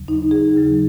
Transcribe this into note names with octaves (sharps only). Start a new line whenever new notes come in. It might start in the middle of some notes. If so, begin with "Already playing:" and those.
Already playing: D#2 C#3 F#3
D#4
G#4
D#2 C#3 F#3